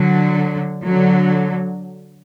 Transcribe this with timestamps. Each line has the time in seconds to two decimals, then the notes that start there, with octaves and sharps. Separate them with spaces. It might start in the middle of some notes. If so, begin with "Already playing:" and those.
Already playing: D3 F#3
0.86 D3 F#3